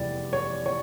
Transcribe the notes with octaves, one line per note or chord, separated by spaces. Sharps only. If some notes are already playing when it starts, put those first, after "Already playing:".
Already playing: F1 E2 E3 G3 D5
C#5
C#5